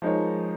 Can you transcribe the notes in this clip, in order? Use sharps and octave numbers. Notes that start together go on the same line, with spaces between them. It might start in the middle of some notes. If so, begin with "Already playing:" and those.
F3 G#3 D#4 A#4 C#5